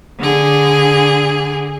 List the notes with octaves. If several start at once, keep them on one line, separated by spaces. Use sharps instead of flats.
D3 G#4